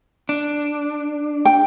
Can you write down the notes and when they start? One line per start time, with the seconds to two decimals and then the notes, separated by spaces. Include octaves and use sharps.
0.29 D4
1.45 G5